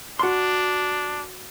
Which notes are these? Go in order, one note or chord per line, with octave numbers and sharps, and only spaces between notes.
D4 F#4 C6